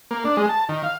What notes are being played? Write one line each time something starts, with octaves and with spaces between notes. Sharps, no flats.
A#3
D4
G#3
A5
D#3
F5